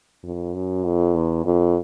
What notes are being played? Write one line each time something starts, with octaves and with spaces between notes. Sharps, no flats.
F2
F#2
F2
E2
F2